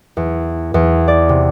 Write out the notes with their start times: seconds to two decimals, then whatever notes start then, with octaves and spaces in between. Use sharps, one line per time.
0.17 E2
0.74 E2
1.08 D5
1.29 C3